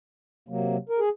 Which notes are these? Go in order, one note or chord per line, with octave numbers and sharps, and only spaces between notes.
C3 F#3 A#3
A#4
G#4